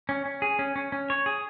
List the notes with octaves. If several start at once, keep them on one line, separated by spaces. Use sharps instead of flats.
C#4
C#4
G#4
C#4
C#4
C#4
C#5
G#4